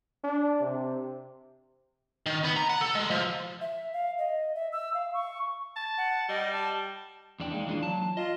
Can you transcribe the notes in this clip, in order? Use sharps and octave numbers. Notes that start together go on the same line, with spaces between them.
D4
C3
D#3
B3
A#5
F#5
A4
G#3
F3
E5
F5
D#5
E5
E6
F5
C#6
A5
F#5
G3 D#5
A5
E2 D4 G5
G#3 A#3 D#4
E3 D4 F4
F#3 A5
F4 D#5